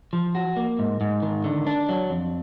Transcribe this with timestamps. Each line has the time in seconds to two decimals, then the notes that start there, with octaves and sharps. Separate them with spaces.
0.13 F3
0.35 F#4
0.57 A#3
0.79 G#2
1.01 G#2
1.23 D#3
1.44 D3
1.67 D4
1.89 F#3
2.10 F2